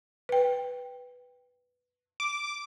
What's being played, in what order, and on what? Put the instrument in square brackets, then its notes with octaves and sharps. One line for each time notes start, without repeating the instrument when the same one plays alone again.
[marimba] B4 G5
[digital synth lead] D6